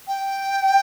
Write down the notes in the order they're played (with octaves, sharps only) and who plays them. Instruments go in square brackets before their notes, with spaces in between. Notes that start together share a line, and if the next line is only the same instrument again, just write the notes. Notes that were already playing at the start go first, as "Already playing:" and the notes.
[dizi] G5